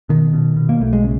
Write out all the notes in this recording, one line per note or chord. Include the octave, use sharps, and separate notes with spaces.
B2 D#3
B2
B2
A#3
B1 A3
G#3
C#3